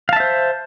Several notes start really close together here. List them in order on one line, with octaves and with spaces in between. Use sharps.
F5 A5 E5 C5